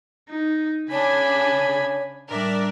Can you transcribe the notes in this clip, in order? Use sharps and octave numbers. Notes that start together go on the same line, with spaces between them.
D#4
C#3 D4 G#4 C#5 G#5 B5
A2 G3 D4 A#4 D5 E5